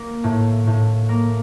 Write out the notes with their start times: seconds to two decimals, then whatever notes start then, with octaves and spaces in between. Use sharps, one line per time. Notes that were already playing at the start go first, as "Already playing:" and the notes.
Already playing: A#3
0.24 A2
0.67 A2
1.09 A#3